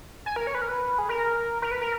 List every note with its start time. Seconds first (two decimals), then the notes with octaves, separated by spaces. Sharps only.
0.26 G#5
0.36 A#4
0.47 C#5
0.55 B4
0.62 A#4
0.69 B4
0.99 G#4
1.09 A#4
1.62 A#4
1.71 B4
1.81 A#4